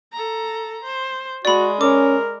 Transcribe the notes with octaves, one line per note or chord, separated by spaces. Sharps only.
A4 A#5
C5
G#3 F#4 D5 B5
C#4 A#4 D6